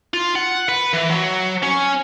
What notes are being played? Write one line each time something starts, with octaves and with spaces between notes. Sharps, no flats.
F4
F#5
B4
E3
F#3
C#4